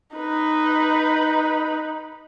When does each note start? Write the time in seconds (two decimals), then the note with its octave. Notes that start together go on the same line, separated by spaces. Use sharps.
0.15 D#4 B4